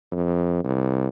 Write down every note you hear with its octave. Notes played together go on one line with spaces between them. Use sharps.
F2
C2